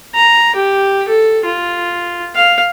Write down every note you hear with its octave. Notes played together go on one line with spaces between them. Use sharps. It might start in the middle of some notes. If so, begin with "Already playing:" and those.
A#5
G4
A4
F4
F5